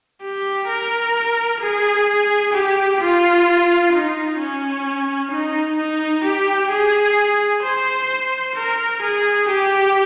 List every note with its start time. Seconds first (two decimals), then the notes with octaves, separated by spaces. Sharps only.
0.22 G4
0.68 A#4
1.61 G#4
2.53 G4
3.00 F4
3.93 D#4
4.39 C#4
5.31 D#4
5.78 D#4
6.24 G4
6.70 G#4
7.63 C5
8.55 A#4
9.02 G#4
9.48 G4